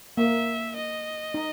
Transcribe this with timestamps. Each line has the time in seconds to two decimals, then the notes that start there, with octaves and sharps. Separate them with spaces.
0.17 A#3 E5
0.76 D#5
1.34 D#4